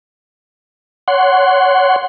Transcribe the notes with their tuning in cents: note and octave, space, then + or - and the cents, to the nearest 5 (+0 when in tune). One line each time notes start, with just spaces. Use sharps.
C#5 +15 F#5 +5 C6 +0